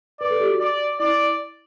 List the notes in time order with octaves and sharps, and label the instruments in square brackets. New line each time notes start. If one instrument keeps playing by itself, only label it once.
[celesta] B4 [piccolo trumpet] D5
[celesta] A4
G4
F#4
[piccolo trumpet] D5
[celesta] E4 [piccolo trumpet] D5